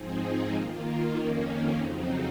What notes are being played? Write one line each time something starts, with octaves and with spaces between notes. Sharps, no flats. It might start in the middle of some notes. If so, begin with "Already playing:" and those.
Already playing: G#2 F3 C4 D#4 G#4
D#3 A#3 F4
F2 D#3 A#3 C#4
F2 C#3 F#3 C4 D#4